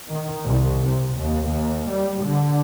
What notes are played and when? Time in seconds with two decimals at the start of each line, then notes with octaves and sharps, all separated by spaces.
0.11 D#3
0.47 C2
0.88 C3
1.18 D#2
1.49 D#2
1.90 G3
2.26 D3